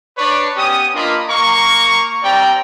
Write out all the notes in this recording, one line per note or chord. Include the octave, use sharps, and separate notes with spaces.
D4 B4 C#5 D5
B3 C#4 G4 D#6
A#3 D4 F4 A#4 D#5 B5
A#3 A#4 A#5 C#6
G3 C4 D5 G5 A#5